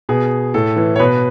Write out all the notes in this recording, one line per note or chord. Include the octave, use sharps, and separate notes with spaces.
B2 G#4
A2 A4
E3
C#5
B2 B4